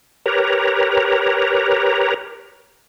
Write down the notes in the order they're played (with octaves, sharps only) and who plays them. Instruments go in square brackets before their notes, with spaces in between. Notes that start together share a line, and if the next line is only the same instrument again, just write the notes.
[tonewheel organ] G4 A#4 B4 C#5 A#5